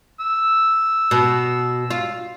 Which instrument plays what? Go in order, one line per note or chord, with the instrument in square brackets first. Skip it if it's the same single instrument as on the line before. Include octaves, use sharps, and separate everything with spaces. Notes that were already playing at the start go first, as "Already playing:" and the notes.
[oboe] E6
[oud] B2
F4